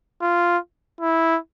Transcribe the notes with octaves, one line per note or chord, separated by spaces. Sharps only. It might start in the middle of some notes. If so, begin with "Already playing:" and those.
F4
E4